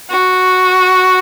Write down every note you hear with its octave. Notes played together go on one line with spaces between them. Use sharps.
F#4